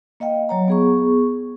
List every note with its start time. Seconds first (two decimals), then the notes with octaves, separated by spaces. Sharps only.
0.20 A#3 D#5 F5 G5
0.49 F#3 C#5 A#5
0.68 B3 G#4 C#6